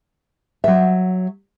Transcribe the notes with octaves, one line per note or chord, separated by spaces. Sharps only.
F#3 E5